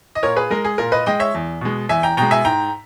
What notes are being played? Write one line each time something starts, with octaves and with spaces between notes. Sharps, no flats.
D#5
A#2 A#4 C#5
G#4 B4
G#3 A#4
G#4
A#2 A#4
B4 D#5
G#3 D#5 G5
C#5 E5
E2
B2 G#3
E2 E5 G#5
G5 A#5
B2 G#3 G5 A#5
E5 G#5
G#2 G5 A#5